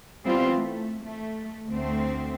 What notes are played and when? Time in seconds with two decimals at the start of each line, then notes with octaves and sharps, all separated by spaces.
0.25 E3 G3 B3 C4 F4
0.56 A3
1.03 A3
1.69 D2 A3 C4